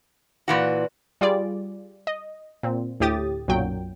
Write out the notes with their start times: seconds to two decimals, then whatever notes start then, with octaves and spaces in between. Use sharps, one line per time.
0.48 A#2 E3 F#4 B4 D5
1.21 G3 F4 G#4 D5
2.07 D#5
2.63 A#2 C4
3.00 D2 A2 G4 D#6 A6
3.48 B1 F#2 A#2 F#3 G5